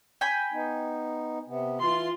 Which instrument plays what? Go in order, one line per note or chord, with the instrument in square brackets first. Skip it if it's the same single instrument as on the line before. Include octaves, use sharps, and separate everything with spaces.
[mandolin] G5 G#5 B5
[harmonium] B3 D#4
C3 B3
[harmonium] E3 [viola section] F4 C6